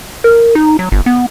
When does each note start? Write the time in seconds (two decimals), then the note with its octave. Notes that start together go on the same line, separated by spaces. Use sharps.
0.24 A#4
0.55 D#4
0.79 F#3
0.92 G1
1.06 B3